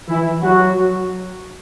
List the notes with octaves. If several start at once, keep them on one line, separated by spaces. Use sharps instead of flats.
E3 E4
F#3 F#4